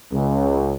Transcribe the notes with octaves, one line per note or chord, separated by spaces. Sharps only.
C#2